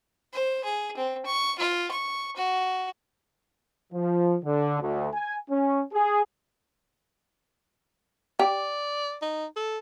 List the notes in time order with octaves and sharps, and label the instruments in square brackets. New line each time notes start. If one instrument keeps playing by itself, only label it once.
[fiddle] C5
G#4
C4
C#6
F4
C#6
F#4
[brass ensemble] F3
D3
D2
G#5
C#4
G#4
[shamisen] G4 [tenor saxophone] D5
[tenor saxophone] D#4
A4